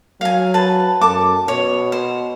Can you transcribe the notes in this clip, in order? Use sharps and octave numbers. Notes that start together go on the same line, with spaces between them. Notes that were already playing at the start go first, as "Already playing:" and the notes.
F#3 F5 G#5
B4 A5
F#2 A4 A5 D6
B2 C#5
C5